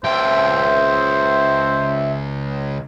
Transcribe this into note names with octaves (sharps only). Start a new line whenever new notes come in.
C#2 C5 E5 G5